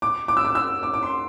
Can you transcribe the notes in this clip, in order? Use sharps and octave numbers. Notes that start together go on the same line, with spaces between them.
D6
D6
E6
D6
E6
D6
D6
C6